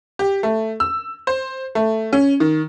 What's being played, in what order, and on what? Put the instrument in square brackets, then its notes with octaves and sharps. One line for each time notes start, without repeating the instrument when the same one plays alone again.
[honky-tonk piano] G4
A3
E6
C5
A3
C#4
D#3